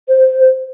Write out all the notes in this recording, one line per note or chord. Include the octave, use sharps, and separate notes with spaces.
C5